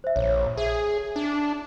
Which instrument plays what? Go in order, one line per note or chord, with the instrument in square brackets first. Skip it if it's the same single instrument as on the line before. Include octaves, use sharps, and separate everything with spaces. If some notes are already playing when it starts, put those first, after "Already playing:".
[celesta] C5 E5
[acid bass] A#1 [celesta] C#5
[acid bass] G#4 [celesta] E5
[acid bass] D4